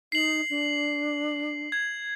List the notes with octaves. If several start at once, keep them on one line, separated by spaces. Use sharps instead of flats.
D#4 C7 F#7
D4
G#6